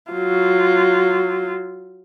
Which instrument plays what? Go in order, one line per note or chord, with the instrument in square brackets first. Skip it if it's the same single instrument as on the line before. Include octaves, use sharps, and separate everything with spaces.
[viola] F#3 F4